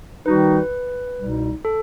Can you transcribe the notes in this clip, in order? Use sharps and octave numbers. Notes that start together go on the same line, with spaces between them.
D#3 G3 D#4 F#4 B4
C2 B2 G3 D#4
A4